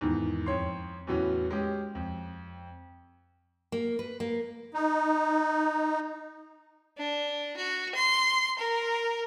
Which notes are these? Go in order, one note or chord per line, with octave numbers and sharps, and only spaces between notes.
E2 G#2 D#3
F2 C#5 C6
E2 A2 F#3 B3 C#4
G#3 C#4 G4
F2
A#3
B4
A#3
D#4
D4
F#4
C6
A#4